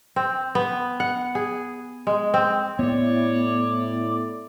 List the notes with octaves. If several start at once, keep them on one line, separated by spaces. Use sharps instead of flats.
C4
B3
F#5
G#4
G#3
C4
A2 B3 E4 C#5 D5